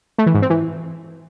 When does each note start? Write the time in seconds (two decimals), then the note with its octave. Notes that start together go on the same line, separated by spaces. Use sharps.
0.18 A3
0.26 E3
0.34 G#2
0.42 C4
0.50 E3